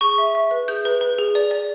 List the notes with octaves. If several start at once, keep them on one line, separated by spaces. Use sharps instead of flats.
G#4 C#6
E5
E5
B4
G#4 G6
B4
B4
G#4
D5
D5